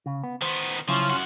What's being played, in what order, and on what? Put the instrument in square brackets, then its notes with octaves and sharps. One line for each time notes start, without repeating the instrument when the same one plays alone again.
[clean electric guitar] C#3
B3
[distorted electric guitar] D#3 B3 [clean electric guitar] C5
[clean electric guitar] C#3 F#3 E4 [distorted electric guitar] F3 [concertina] C#4 F4 C6
[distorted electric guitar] F#2 F#4